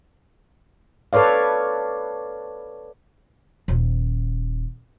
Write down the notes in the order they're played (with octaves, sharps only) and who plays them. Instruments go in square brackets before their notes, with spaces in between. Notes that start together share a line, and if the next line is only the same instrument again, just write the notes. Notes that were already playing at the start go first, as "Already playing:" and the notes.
[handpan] A4 B4 C#5 D5 F5
[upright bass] D#1